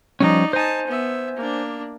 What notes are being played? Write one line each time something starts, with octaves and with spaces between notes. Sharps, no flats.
F3 G3 C#4 D#4 D5
D#4 C5 G#5 A5
B3 E5
A#3 D4